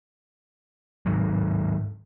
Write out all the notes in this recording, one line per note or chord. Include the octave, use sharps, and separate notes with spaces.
G#2 D#3 F#3